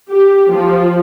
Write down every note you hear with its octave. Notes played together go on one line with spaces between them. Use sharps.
G4
F3